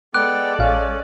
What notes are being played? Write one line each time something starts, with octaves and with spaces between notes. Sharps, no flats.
G#3 B3 A4 D5 G5 D6 F#6
A1 C#4 F5